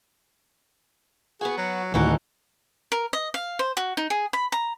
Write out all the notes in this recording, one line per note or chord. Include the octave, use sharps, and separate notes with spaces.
B3 F#4 G#4
F#3
D2 A2 D#3 E3 D4 D#4 F#4
A#4
D#5
F5
C5
F#4
D#4
G#4
B5
A#5